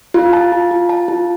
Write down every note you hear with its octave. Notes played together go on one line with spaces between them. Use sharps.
F4
A5
F4
F4
A5
F4